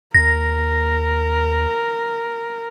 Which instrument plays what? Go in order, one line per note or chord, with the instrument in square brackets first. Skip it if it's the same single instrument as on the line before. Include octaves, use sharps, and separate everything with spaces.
[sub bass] D#2 [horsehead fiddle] A#4 [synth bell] A#6